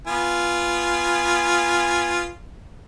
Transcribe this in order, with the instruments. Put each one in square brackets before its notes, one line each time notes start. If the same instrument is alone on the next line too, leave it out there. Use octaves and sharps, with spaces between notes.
[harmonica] B3 F4 G#5